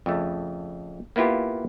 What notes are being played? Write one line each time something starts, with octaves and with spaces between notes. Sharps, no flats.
F2 C#3 A3
A#3 B3 E4 F4 G4